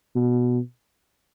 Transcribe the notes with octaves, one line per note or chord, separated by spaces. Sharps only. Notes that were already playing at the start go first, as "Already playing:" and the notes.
B2